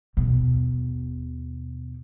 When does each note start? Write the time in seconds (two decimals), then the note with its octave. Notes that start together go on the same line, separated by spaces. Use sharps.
0.17 D#2 B2